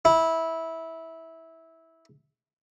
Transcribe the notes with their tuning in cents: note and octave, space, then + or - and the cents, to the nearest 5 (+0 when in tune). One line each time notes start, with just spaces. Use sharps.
E4 -15